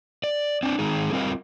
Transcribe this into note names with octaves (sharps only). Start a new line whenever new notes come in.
D5
C4 D4
D#3 G#3 D#4 G#4
G3 C4 F4 A#4 D#5 F5